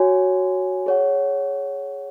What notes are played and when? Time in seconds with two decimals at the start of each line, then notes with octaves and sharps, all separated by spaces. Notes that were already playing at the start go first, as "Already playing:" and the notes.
Already playing: F#4 C#5 G#5
0.86 G#4 C#5 F#5